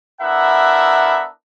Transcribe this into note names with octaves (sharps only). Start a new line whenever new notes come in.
B3 D4 E4 A#4 E5 F#5